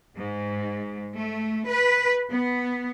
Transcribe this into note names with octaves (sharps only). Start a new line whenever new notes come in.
G#2
A3
B4
B3